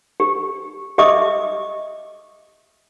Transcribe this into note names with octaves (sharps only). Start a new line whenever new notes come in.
G4
G4 D#5 E5 D6 D#6